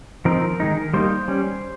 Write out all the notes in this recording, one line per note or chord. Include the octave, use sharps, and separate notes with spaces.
F3 C4 D#4 A#4
D#3 G#3 D#4
G3 A#3 D#4 C5
G3 C#4